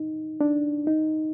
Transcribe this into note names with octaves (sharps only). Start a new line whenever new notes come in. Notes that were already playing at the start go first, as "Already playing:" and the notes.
Already playing: D#4
D4
D#4